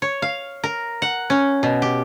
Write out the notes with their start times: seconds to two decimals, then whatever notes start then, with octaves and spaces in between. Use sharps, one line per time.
0.02 C#5
0.22 F5
0.64 A#4
1.02 F#5
1.30 C#4
1.63 B2
1.82 G4